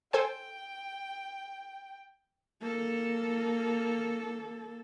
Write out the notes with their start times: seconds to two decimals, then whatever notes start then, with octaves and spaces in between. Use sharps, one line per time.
0.13 A4 C5 G5 G#5
2.62 A#3 A4